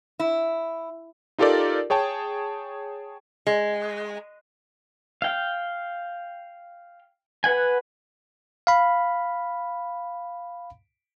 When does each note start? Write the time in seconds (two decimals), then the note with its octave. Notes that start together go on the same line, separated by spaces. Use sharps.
0.19 E4
1.38 D#4 F4 G4 A4 A#4 D5
1.90 G#4 C#5 G5 A5
3.47 G#3
5.22 F5 G5
7.44 B4 F#5 G#5
8.67 F5 B5